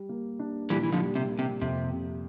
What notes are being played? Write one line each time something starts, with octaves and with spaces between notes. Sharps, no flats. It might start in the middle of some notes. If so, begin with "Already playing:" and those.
Already playing: G3
A#3
D4
A#2 E3 G3
E3
D3 F3
G3
C3
A#3
C3
F2 C3
C3